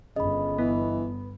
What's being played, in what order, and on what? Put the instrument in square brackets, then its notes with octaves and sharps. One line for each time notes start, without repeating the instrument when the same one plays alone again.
[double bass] G1 G2 [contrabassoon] C#3 [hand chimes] D#5 B5
[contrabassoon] E3 [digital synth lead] B3